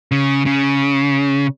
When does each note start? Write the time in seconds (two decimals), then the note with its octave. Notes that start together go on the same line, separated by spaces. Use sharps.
0.11 C#3
0.46 C#3